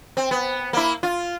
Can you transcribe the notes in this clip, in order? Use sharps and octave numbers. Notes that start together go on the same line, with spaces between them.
C4
B3
A#3 E4
F4